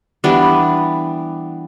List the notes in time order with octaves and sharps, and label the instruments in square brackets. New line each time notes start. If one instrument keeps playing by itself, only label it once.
[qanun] E3 G3 B3 D4